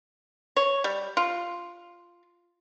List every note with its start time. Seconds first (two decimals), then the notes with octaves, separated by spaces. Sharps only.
0.56 C#5
0.84 G3
1.17 F4